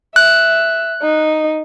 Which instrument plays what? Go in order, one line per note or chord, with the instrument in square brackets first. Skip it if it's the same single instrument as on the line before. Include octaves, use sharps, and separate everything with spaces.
[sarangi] E5 [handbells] F#6
[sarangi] D#4